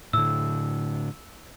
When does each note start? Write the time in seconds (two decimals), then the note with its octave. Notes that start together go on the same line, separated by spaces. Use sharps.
0.13 A2 D3 E6